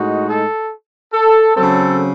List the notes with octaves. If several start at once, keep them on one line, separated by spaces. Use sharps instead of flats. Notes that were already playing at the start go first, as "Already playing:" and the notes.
Already playing: A2 G#3 D#4 F#4
A4
A4
C#3 F#3 C4 A4